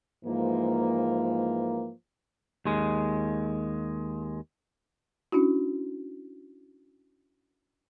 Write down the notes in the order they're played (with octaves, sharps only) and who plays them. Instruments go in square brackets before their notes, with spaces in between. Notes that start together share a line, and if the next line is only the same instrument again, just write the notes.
[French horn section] G#2 E3 F3 A#3
[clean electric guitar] D#2 G#3
[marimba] C#4 D4 E4 F#4